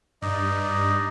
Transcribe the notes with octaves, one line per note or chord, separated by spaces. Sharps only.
G2 D#4 D5 D#5